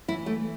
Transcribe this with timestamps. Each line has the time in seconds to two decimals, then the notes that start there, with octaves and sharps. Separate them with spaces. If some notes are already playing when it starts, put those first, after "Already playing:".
0.08 E3 E4
0.26 A3